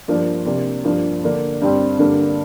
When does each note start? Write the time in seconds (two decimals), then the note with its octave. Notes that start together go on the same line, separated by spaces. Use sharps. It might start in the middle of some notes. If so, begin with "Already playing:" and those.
0.08 G2 F3 A#3 D4
0.46 C3 A#3 D4
0.84 G2 F3 A#3 D4
1.23 D3 A#3 D4
1.62 G2 G3 C4
1.99 G2 D3 A#3